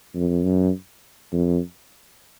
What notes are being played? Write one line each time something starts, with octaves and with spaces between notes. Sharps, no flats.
F2
F#2
F2